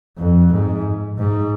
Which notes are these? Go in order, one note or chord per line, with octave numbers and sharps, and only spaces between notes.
F2
G#2
G#2